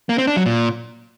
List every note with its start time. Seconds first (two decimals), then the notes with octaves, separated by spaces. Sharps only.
0.09 A#3
0.18 C4
0.27 D4
0.37 F#3
0.46 A#2